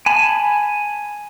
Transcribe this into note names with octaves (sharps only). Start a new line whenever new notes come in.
G#5 A5 B5